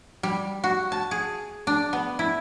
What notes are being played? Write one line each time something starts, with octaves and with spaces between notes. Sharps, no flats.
G3
F#4
A5
G#4
D4
B3
E4